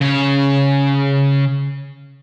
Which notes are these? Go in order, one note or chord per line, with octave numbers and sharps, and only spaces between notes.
C#3 C#5